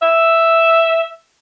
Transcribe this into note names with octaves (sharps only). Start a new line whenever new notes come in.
E5